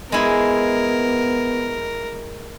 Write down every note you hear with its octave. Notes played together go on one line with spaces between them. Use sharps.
G#3 B3 E4 A#4